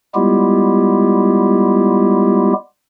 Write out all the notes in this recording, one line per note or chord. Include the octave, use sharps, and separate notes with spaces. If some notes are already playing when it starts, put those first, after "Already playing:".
G3 G#3 B3 E4 F4 G4